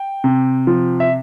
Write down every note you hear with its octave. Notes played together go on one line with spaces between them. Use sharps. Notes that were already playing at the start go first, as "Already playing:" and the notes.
Already playing: G5
C3
F3
E5